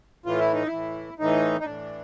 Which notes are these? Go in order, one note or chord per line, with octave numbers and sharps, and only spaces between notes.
A2 E3 F4
E4
D#4
E4
A2 E3
A2 E3 D#4
D#4
A2 E3 D4